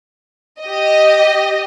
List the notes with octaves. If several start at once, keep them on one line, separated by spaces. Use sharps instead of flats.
G4 D#5